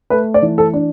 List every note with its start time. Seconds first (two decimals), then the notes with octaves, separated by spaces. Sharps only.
0.10 A3 B4
0.34 D5
0.42 E3
0.58 A4
0.73 D4